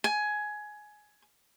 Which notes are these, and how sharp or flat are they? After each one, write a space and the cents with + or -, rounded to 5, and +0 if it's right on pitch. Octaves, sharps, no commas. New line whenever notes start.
G#5 +15